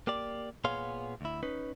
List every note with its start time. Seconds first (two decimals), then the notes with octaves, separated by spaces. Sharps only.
0.07 A#3 G4 D5
0.64 A#2 B3 G#4 C#5 F5 C6
1.21 D2 E4
1.43 C#4 D#4 B4